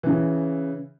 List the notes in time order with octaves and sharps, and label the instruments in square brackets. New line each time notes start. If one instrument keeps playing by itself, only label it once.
[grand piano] C#3 E3